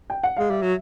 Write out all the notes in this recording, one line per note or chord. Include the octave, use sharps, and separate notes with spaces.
G5
F#5
G#3 F5
G3 E5
F#3